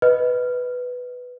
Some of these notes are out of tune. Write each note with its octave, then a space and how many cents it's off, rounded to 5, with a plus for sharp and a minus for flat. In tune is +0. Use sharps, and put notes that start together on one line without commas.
B4 +5 D#5 +0